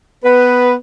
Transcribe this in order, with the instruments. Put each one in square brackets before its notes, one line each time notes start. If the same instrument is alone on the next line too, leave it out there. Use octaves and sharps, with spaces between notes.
[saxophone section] B3 B4